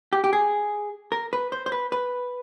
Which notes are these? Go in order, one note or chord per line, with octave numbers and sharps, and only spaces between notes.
G4
G4
G#4
A#4
B4
C5
C5
B4
B4